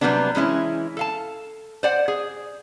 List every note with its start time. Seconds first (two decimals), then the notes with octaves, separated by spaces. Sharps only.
0.01 C3 F#3 G3 A#3 B3 D4
0.35 E3 G#3 C#4 E4
0.97 A4 F5 A5
1.83 C5 D5 F#5
2.08 G#4